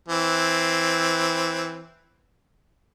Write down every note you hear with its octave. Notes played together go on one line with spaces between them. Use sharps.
E3 C4